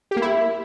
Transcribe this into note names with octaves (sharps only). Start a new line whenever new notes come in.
G4
A#3
E4